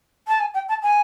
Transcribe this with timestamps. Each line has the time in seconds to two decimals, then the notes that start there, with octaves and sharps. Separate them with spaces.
0.28 A5
0.40 G#5
0.54 G5
0.69 A5
0.83 G#5